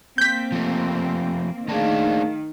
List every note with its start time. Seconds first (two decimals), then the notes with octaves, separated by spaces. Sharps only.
0.18 A#3 C4 G6 B6
0.52 F3 A3
1.69 D#3 A3 A#3 D4 G#4 F5